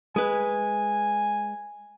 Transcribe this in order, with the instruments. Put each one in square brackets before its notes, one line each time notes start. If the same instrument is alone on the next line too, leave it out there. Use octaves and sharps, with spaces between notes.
[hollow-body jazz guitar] G#3 B4 [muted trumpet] G#5